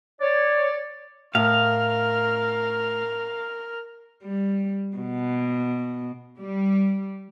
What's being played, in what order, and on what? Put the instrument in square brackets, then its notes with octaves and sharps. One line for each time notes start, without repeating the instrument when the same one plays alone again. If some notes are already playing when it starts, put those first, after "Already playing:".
[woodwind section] C#5 D5
[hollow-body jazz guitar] A2 [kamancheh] A#4 F6 [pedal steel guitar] F5
[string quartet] G3
B2
[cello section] G3